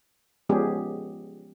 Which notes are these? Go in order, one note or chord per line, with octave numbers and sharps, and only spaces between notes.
F3 G#3 B3 C#4 G4 G#4